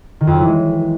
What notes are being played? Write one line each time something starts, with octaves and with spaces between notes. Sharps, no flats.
D#3
F2
F#3
E3
G#3